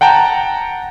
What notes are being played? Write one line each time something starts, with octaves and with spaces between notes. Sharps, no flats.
F#5 G5 A5 A#5